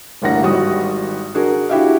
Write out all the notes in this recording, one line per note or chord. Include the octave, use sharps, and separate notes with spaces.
A1 D2 G2 A#3 F#5 A#6
G#1 G3 F#4 D#6
D4 F#4 G#4 A#4
D4 E4 F#4 G4 E5 F5